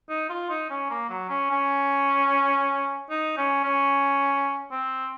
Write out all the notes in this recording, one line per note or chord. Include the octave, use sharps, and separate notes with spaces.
D#4
F4
D#4
C#4
A#3
F#3
C#4
C#4
D#4
C#4
C#4
C4